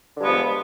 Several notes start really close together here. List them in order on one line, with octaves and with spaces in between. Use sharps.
D3 G2 G#3 B3 F3